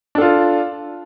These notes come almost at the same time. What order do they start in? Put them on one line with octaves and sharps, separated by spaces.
D4 A4 F4